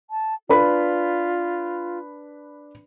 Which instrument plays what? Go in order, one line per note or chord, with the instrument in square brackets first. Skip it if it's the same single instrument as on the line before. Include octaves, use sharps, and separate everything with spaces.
[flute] A5
[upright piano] D4 B4 B5 [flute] F4